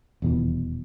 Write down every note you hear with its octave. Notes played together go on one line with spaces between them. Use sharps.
D#1 E2 B2 E3